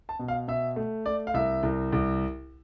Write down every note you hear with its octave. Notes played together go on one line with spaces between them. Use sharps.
A5
B2
F5
B2 E5
A3
A3 D5
F5
C2 E5
C2
C2